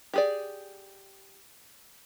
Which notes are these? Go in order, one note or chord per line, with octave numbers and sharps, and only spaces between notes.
G4 G#4 D5